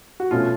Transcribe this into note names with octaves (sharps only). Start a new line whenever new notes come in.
F#4
B2 A3 C#4 F4